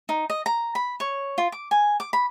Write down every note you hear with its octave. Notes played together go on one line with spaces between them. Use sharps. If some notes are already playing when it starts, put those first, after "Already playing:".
D#4
D#5
A#5
B5
C#5
F4
D6
G#5
D6
B5